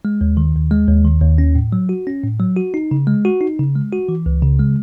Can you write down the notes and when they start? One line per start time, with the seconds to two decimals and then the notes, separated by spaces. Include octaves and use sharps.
0.05 G#3
0.21 D#2
0.37 D#3
0.55 D#2
0.71 G#3
0.88 D#2
1.05 D#3
1.22 D#2
1.38 C#4
1.55 A2
1.73 F#3
1.89 F#4
2.07 C#4
2.24 A2
2.40 F#3
2.57 F#4
2.74 D#4
2.91 C#3
3.07 G#3
3.25 F#4
3.41 D#4
3.59 C#3
3.76 G#3
3.93 F#4
4.09 E3
4.26 C#2
4.42 C#3
4.59 G#3